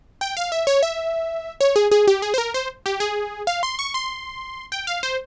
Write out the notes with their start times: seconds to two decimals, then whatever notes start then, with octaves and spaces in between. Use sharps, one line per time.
0.21 G5
0.37 F5
0.52 E5
0.67 C#5
0.83 E5
1.61 C#5
1.76 G#4
1.91 G#4
2.07 G4
2.22 G#4
2.34 C5
2.38 A#4
2.54 C5
2.86 G4
3.00 G#4
3.47 F5
3.63 C6
3.79 C#6
3.94 C6
4.72 G5
4.87 F5
5.03 C5